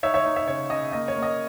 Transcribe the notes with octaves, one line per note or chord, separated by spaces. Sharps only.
D#4 C#5 E5
C#5 E5
D#4
C#5 E5
C#3 C#5
C#3 D#5
A#3 D#5
C#5
A#3
D#5